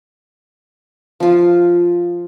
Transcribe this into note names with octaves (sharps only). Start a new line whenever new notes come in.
F3 F4